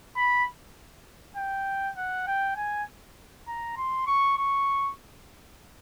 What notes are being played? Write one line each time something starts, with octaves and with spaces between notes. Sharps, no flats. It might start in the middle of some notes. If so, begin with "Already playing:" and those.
B5
G5
F#5
G5
G#5
A#5
C6
C#6
C#6